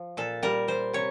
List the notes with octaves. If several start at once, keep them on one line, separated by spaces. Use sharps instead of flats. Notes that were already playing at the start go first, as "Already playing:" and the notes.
Already playing: F3
A#2 A4
G3 A#4
G3 C5
C3 C#5